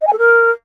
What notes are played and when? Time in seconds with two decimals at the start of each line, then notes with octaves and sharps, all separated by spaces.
0.01 D#5
0.07 G#5
0.13 A4
0.18 A#4